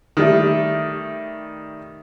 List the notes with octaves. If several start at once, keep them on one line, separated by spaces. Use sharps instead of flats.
D#3 G3 A3